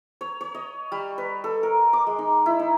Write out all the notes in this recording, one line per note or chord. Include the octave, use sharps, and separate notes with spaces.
C#5
C#5
D#5
G3
B4
A4
A#4
D6
G#3
D#4
E4
D#4